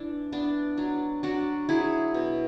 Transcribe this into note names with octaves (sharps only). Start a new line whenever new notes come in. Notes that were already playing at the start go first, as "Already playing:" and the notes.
Already playing: E3 D4 E4
B3 D4
F#3 D4
F#3 D4 F#4
F#3 E4 G#4
B2